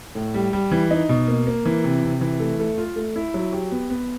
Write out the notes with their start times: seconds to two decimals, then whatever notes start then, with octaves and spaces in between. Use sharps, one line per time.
0.15 A2
0.34 G3
0.53 G3
0.71 E3
0.91 D#4
1.09 B2
1.27 A#3
1.47 A#3
1.65 E3
1.84 C3
2.02 C3
2.21 E3
2.40 A3
2.59 A3
2.78 F4
2.96 A3
3.16 E4
3.34 F#3
3.52 G4
3.71 B3
3.90 B3